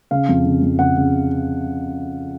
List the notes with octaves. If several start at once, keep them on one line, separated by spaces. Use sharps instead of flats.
C#3 F5
F2
C#3
F2
C#3 F#5
C#3